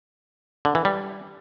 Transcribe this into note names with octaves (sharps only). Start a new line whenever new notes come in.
D3
E3
G3